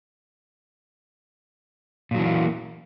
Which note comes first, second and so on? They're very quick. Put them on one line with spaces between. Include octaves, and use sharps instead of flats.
A#2 F#3 E3 B3 A#3